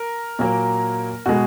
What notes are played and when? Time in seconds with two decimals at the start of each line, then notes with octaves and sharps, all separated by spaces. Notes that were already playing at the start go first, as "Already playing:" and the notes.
Already playing: A#4
0.39 A#2 F#3 A#3
1.26 B2 G#3 F#4